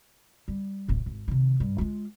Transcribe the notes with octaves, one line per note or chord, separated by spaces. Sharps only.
G3
D1 A1
G#1
C3 D#3
G2
G#3 F4